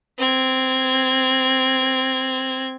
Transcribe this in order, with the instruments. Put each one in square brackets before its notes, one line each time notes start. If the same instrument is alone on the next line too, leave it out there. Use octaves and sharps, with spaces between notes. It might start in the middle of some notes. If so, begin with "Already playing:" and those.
[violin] C4 G#6